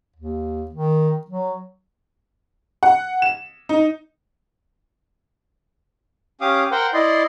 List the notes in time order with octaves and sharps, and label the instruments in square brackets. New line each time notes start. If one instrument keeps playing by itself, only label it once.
[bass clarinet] D#2
D#3
F#3
[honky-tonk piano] F#5
E7
D#4
[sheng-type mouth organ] C#4 G4 F5 D6 D#6
A#4 C5 F#5 G5
E4 D5 D#5 C6